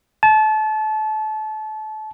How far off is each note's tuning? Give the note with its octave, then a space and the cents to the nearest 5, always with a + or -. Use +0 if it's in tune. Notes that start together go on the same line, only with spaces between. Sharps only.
A5 -30